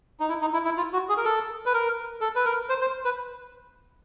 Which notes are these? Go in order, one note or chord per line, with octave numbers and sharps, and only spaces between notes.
D#4
E4
D#4
E4
E4
F4
F#4
G#4
A#4
A4
B4
A#4
A4
B4
A#4
C5
C5
B4